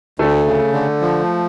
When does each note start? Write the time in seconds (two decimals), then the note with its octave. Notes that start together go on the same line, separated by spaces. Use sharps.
0.19 D2 A3
0.46 C#3
0.74 D3
1.01 F3